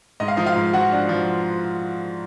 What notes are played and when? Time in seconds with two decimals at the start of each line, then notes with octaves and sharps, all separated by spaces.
0.20 G#2 D#5
0.28 F5
0.37 F3 D#4 D#5
0.46 F4 F5
0.56 G#2
0.73 F3 F#4 F#5
0.92 D4
1.09 F3